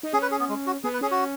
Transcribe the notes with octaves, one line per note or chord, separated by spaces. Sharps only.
D#4
C#4 G#4
B4
G#4
B3
G#3
F#4
B3 G#4
B4
C#4 G#4
F#4